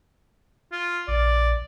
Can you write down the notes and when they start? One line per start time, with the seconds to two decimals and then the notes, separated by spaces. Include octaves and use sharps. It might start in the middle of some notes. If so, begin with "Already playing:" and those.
0.72 F4
1.08 A#1 D5